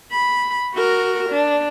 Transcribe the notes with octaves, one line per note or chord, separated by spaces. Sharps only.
B5
F#4 A#4
D4